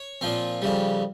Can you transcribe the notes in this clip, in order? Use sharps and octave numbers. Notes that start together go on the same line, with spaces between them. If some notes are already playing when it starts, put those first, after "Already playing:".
Already playing: C#5
A#2 F3 C4
F2 C#3 G3